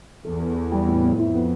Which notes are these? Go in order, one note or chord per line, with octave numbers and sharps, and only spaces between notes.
E2 A4
A4
A4
G3
A2
B3
F2 E4
B3